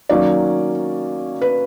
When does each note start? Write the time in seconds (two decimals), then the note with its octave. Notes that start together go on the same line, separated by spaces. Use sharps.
0.09 D#3 F#3 A#3 C#4 D5
1.41 B4